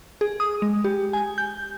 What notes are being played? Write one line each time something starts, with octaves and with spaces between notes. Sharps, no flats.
G#4
D#6
G#3
G4
G#5
G6